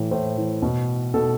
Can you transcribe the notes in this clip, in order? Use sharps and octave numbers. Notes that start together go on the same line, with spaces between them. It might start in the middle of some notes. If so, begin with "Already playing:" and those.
Already playing: A2 E3
A2 C5
E3
B2
B2 A4